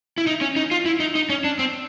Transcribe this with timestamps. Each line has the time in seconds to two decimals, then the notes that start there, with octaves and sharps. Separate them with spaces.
0.18 E4
0.27 D#4
0.41 C#4
0.56 D#4
0.71 F4
0.86 E4
1.00 D#4
1.15 D#4
1.29 C#4
1.44 D4
1.59 C4